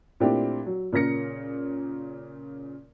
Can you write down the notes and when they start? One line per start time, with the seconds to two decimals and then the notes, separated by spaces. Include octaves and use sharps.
0.20 A#2 A3 C4 D4 E4 G4
0.66 F#3
0.92 A#2 C#3 A#4 A#6 C#7